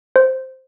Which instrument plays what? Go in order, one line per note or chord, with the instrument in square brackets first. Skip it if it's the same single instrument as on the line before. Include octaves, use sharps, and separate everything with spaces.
[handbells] C5